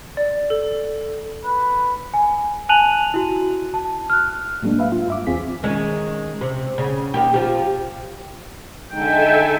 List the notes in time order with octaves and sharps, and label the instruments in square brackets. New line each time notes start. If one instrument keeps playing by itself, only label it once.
[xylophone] D5
A4
[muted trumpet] B4
[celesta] G#5
G#5 A5 F#6 D#7 F7 F#7
E4 F#4
A5
F6 F#6
[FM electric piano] A2 F#3 G#3 A#3 D4
B4 E5 F5
F4
G2 E5 D6
E2 C4 F4 G#4 B6
[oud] D#3 G#3 C#4
C3
C#3
D#2 D#3 G4
F3 G4
[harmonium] D3 G#3 D#4 [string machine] A4 E5 G#5 [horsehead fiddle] G5